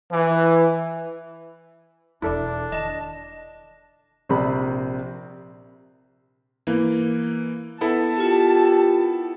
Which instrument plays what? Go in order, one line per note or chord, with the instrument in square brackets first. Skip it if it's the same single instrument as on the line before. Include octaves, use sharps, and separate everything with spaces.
[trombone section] E3
[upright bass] E1 E2 [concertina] D4 [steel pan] E4 A4 D5
[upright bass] D#3 [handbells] D#5 A5
[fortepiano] A#1 C3 D5 B5
[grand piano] E3 A#3
[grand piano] B3 E4 A4 [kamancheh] A5
[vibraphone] F4 A#4 [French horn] G4